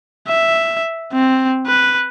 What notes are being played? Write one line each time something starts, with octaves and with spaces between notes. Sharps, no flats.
E5
C4
B4